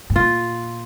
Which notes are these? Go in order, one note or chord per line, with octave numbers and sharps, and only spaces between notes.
G#2
A#2 F4